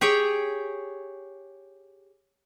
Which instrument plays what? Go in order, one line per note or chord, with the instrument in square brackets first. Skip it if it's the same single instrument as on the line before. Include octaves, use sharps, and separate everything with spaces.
[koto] G4 G#4 C#5 G5